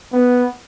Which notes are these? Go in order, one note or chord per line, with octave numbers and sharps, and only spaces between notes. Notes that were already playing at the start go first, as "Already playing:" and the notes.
B3